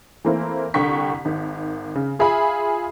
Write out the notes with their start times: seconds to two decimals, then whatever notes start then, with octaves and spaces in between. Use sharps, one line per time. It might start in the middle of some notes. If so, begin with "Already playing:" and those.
0.25 E3 A3 A#3 C4 E4
0.74 C2 D3 G5 C#6 B6
1.25 G#1 D#3
1.95 C#3
2.19 F4 G#4 E5 G#5 B5